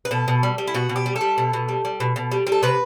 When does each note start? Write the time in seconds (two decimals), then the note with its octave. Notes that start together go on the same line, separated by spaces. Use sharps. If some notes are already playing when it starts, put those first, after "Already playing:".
0.05 B4
0.11 B2 A4
0.28 B2
0.43 G3
0.58 G3
0.67 E4
0.74 B2 F#4
0.89 B2
0.96 G4
1.06 G3
1.16 A4
1.21 G3
1.38 B2
1.53 B2
1.69 G3
1.85 G3
2.00 B2
2.16 B2
2.31 G3
2.47 G3
2.52 A4
2.63 C3 B4